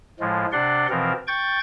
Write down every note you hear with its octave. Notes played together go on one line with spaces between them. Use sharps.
A2 F3 G#3
C3 D4 D5 F#5 C6
B2 E3 F3 C4 A#4
G5 C#6 G6 A6